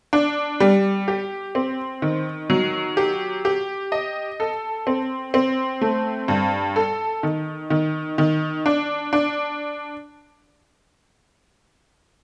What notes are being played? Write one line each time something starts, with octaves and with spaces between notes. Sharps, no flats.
D4
G3
G4
C4
D#3
F#3
G4
G4
D#5
A4
C4
C4
A3
G2
A4
D#3
D#3
D#3
D4
D4